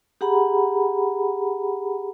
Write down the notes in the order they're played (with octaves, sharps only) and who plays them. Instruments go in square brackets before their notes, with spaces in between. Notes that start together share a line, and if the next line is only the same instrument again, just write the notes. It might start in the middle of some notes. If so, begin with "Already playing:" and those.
[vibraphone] G4 G#4 F#5 A#5 B5